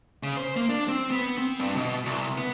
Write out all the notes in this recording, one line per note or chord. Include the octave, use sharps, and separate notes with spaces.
C#3
C5
A#3
D4
C4
B3
C4
G2
B2
C2
B3